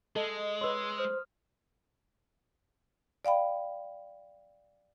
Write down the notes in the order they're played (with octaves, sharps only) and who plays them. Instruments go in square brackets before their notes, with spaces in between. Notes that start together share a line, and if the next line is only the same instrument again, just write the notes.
[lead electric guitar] G#3 [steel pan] A4 [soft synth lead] D#5
[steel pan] B4 C#5 [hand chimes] C6 E6
[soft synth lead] C5 [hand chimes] D#6 F6
[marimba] D5 F5 G5 B5